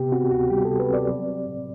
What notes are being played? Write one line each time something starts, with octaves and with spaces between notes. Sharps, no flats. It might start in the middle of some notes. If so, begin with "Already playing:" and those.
Already playing: C3 B3 G4
C4 F#4
D2 F#4
G3 G4
C3 A4
B4
C4 D5
F#3
C4
A2